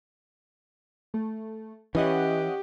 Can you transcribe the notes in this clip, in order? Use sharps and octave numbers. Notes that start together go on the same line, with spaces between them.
A3
E3 C#4 G4 D#5 F#5